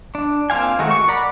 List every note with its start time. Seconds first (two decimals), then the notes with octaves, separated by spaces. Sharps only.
0.15 D4
0.50 A#3 C4 F4 F5 G#5
0.79 D#3 G#3 A3 F#4
0.91 C#6
1.08 A#4 D5 F#5 A#5 B5